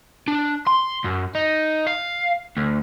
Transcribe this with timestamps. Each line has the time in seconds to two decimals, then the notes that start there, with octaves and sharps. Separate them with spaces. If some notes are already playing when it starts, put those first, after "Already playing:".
0.28 D4
0.67 C6
1.05 F#2
1.35 D#4
1.87 F5
2.57 D2